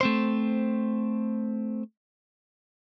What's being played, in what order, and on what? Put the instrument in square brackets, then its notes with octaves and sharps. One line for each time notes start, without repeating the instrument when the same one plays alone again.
[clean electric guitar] A3 C4 C5